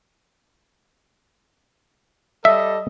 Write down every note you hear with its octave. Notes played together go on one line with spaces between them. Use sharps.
G3 A4 D#5 E5